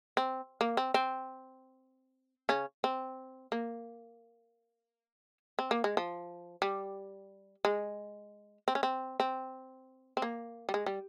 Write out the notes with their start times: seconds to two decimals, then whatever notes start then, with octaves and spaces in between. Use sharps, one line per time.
0.17 C4
0.61 A#3
0.77 C4
0.94 C4
2.49 C#3 C#4
2.84 C4
3.52 A#3
5.59 C4
5.71 A#3
5.84 G#3
5.97 F3
6.62 G3
7.65 G#3
8.68 C4
8.75 C#4
8.83 C4
9.20 C4
10.17 C4
10.22 A#3
10.69 G3
10.74 G#3
10.86 G3